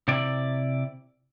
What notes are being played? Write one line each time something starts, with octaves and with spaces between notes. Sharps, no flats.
C3 E4 D5